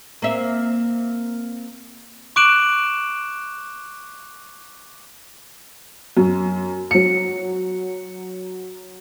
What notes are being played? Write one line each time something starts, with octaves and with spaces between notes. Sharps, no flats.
A#3 C4 E5
C#6 D6 F#6 D7 E7 F#7
F#2
F#3 C#7